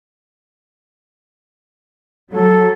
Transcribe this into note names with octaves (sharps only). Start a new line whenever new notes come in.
F#3 A4